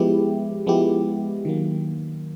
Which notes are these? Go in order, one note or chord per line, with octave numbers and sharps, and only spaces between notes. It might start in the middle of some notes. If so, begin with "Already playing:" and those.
Already playing: F3 G#3 B3 E4 G4
F3 G#3 B3 E4 G4
D#3 F#3 A#3